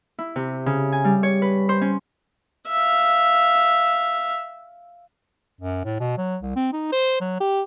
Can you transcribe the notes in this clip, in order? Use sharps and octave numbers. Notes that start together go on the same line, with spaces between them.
E4
C3
C#3
G#5
G3
C#5
B4
C5
C#4
E5 F5
F#2
A2
B2
F#3
C2
C4
D#4
C5
F#3
G4